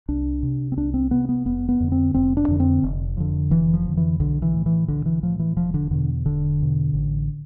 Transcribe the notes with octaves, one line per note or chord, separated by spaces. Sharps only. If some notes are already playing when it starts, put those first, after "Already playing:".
C2 D4
C3
C4
C2 D4
C4
C3 B3
B3
F1 B3
B3
F2 D3
C4
F1 C4
D4
F2 D3
C4
F1
F2 D3
F1 E3
F3
F2 D3
E3
B1 D3
E3
A2
E3
B1 D3
E3
A2 F3
E3
E1 F3
D3
E2 B2 D3
E1 D3
E2 B2
A1